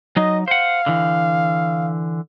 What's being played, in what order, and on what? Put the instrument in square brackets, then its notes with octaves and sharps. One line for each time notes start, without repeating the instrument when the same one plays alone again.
[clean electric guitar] F#3 D#4 [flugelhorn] D#5
[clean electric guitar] C5 F#5 [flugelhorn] F5
[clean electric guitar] D3 E3